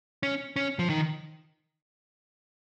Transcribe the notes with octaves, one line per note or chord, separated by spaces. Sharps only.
C#4
C#4
F3
D#3